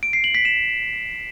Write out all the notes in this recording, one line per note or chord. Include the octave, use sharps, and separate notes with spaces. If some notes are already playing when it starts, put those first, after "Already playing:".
D7
C7
F#7
B6
E7